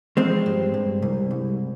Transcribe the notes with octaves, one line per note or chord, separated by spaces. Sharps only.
F3 G#3 C4
G2
G2
C2
C2